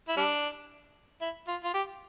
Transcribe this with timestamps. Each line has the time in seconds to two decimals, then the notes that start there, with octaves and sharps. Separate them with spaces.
0.08 E4
0.17 G3 D4
1.21 E4
1.48 F4
1.64 F4
1.74 G4